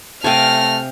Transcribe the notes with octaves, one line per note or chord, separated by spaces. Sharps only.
C3 A3 F5 G5 G#5 F6 A#6